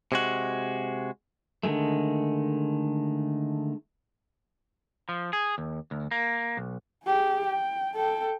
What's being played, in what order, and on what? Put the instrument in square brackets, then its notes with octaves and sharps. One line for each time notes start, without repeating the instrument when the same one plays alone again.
[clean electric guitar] C3 G#3 F#4
[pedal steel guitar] D3 D#3 G#3 A3
[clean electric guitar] F3
G#4
D#2
D2
A#3
B1
[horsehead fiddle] G4 G#4
G5
A4 G5